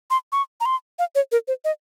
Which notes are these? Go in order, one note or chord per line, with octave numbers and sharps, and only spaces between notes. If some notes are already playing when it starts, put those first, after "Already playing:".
C6
C#6
A#5
C6
F5
C#5
A#4
C5
D#5